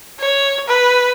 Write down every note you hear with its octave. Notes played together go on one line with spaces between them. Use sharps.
C#5
B4